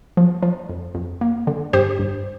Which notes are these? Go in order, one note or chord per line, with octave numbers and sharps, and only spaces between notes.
F3
F3
F2
F2
A#3
D3
G2 G4 C5
G2